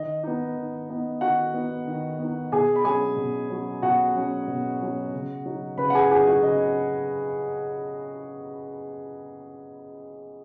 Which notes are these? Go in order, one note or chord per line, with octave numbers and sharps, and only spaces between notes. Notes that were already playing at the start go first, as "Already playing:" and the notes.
Already playing: D#3 D#5
B3 D#4
D#3
B3 D#4
D#3 F#4 F#5
B3 D#4
D#3
B3 D#4
B2 G#4 G#5
B5
F#3 C#4 G#4 G#5
B2
F#3 C#4
B2 F#4 F#5
F#3 C#4
B2
F#3 C#4
C#3
F#3 D#4
C#3 B4 B5
F#5
G#4 G#5
F#5
F#3 D#4 G#4 G#5
F#4 F#5
C#3 D#5